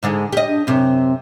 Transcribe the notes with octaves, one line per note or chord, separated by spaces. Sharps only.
G#2 D3 G#3
G4 D#5
D4
F#2 C3 C4